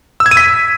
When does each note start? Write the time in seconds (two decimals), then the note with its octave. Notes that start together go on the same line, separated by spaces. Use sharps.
0.20 E6
0.26 G#6
0.31 D#7
0.37 B6